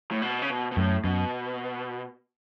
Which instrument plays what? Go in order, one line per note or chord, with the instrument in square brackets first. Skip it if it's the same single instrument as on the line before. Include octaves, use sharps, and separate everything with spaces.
[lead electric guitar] A2
B2
C#3
B2
B2
[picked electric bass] F#2 [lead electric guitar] A2
[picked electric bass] F#2 [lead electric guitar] B2